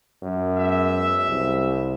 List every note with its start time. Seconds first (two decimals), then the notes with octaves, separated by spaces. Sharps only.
0.22 F#2
0.57 G#3 B3 E5
1.28 C2